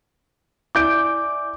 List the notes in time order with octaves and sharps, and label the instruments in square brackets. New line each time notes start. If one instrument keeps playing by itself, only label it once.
[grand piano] E4 G6 D7 [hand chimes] D5 G#5 D6